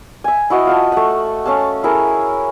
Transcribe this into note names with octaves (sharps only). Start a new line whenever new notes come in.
E5 G#5
E4 F#4 D#5
F4 G5 A5
A3 F#5
C#4 A4 F5 A5
E4 G#4 A#4